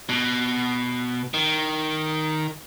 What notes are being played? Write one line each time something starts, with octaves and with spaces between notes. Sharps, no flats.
B2
D#3